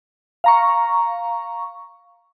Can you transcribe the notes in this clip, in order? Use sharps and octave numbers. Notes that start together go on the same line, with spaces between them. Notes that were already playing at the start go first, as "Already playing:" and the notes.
F5 A#5 C#6